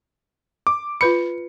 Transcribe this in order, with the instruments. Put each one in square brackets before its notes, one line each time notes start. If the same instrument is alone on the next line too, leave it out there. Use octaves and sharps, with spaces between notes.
[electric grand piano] D6
[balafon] F4 B4 B5 [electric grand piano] C#7